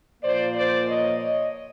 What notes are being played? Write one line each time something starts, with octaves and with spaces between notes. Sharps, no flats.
A#2 F3 A#3 C5 D5
C5 D5
C#5 D#5
C#5 D#5